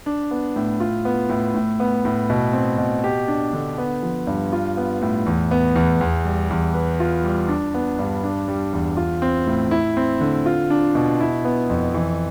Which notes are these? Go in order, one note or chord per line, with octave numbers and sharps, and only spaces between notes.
D4
B3
A2
F4
B3
A2
A2
B3
A2
B2
C4
B2
G4
D4
D3
B3
F3
G2
F4
B3
A2
E2
B3
E2
E2
G3
E2
B4
F4
G3
D4
B3
G2
D4
G3
E2
F4
C4
A2
E4
C4
D3
F4
D4
B2
E4
B3
F2
E3